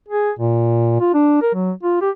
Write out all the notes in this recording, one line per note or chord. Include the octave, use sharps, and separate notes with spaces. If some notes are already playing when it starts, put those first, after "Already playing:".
G#4
A#2
F4
D4
A#4
F#3
F4
G4